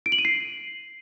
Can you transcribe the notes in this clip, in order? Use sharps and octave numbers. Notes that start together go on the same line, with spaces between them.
D7
F#7
D#7
C7